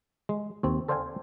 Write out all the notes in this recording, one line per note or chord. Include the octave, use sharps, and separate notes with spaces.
G#3
D#2 C4
A4 C5 D5 F5 G5 G#5